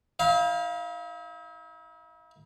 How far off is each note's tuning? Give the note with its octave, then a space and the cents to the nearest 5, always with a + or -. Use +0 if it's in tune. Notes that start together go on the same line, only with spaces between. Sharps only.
E4 -45 F5 +0